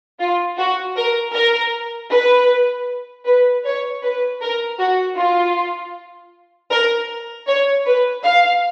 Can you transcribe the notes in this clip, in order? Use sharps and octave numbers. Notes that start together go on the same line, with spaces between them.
F4
F#4
A#4
A#4
B4
B4
C#5
B4
A#4
F#4
F4
A#4
C#5
B4
F5